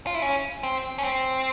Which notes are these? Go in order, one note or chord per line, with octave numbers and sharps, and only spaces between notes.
F4
E4
C#4
C4
C#4
C4